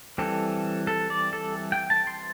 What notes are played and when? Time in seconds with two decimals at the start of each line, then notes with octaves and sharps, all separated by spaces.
0.18 E3 G3 C4 A4
0.87 A4
1.10 D5
1.33 A4
1.72 G5
1.90 A5
2.07 C6